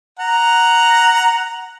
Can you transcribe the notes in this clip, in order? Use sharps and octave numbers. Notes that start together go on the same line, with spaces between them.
F#5 A#5